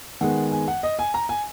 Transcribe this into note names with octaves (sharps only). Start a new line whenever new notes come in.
D#3 G#3 B3 F#5
G#5
F#5
D#5
G#5
A#5
G#5